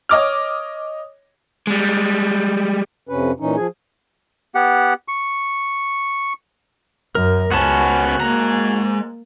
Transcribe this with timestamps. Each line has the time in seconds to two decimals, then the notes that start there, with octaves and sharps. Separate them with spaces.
0.09 C#5 D#5 D6 F6
1.67 G3 G#3
3.09 F2 C3 C#4 B4
3.40 A#2 E3 C#4 D#4
3.56 F3 G#4 G#5
4.55 B3 G4 F#5
5.08 C#6
7.15 F#2 A#4
7.51 C#2 B3 C#4 F#4 A5
8.21 G#3 A#3 A#5